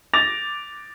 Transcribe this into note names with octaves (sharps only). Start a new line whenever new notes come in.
D6 A6 A#6 F7